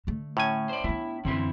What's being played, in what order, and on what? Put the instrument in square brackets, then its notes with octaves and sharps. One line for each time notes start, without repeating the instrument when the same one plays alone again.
[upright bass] D3 A3
[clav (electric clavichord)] A2 C#4 G#5
[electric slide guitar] C5 D5
[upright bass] B3 D4 [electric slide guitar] E4
[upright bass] F#2 E3 [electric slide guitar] D3 C4 E4